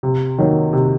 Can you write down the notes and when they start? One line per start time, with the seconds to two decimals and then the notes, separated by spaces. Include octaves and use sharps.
0.03 C3
0.38 D#3 F#3 A#3
0.73 C3